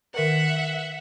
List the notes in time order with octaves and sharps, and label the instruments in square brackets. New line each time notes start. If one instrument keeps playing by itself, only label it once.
[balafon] D#3 A#4 B4 [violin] E5 F#5